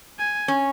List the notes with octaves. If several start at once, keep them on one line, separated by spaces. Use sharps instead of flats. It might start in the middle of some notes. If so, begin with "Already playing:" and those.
G#5
C#4